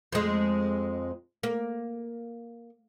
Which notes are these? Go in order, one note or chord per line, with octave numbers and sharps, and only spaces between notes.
F2 G#3
A#3